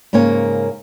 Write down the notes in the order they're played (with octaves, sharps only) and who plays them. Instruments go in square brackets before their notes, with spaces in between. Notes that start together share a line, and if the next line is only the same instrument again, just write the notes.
[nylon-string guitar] G#2 C#3 A#3 C#5 G#5